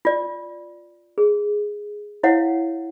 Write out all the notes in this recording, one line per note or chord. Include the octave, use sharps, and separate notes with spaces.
F4 D5
G#4
E4 C#5 F5 F#5